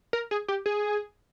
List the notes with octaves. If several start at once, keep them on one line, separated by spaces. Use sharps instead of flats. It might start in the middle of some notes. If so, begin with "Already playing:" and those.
A#4
G#4
G4
G#4